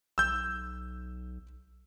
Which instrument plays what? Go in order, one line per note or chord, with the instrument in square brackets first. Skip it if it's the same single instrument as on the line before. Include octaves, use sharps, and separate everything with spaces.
[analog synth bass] B1 [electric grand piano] E6 G6